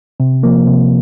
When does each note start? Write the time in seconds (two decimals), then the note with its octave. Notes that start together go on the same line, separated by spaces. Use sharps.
0.20 C3
0.43 F3 A#3
0.67 C3